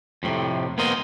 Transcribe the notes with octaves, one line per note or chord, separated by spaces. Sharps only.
F2 A2 C3
A#3 B3 A#4 C5 D#5